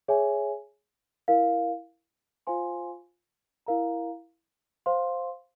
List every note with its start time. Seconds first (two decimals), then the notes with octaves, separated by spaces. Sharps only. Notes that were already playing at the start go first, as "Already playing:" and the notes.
0.08 G#4 C#5 E5 G#5
1.28 E4 A#4 F5
2.47 F4 C5 F5 G#5 C6
3.66 E4 A#4 F5 A#5
4.86 C5 F5 C6